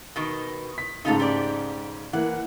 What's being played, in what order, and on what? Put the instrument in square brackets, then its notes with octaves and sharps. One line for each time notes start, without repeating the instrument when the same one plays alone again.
[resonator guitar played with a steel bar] B2 D#3
[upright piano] B6
[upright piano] G#2 C#3 [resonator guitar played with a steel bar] D#4 F4 A4
[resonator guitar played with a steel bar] G4 D5
[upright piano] E3 A#3 [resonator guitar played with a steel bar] F#5